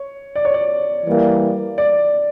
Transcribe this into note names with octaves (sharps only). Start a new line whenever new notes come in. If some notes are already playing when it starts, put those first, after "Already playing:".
Already playing: C#5
D5
C#5
D5
E3 G3 A#3
D5